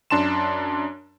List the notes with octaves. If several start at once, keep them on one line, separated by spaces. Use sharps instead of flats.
F#2 D4 A5 C6 E7